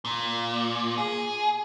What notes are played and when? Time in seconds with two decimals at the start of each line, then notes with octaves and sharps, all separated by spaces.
0.05 A#2
0.98 G#4